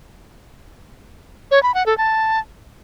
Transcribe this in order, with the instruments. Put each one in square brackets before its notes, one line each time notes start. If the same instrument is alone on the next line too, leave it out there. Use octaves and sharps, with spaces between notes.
[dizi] C#5
B5
F#5
A4
A5